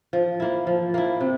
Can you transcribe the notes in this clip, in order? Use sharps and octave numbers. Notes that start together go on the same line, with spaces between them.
F3
A#3 E4
F3
A#3 E4
C3